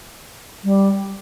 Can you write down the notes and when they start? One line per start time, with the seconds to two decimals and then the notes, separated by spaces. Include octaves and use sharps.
0.64 G3